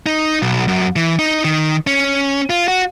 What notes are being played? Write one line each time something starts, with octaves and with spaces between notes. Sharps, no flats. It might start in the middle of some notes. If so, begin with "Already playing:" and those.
D#4
B1
F#2
E3
D#4
D#3
C#4
F4
F#4